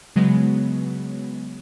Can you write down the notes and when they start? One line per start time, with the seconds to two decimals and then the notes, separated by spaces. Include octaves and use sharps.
0.16 C#3 F#3 G#3 B3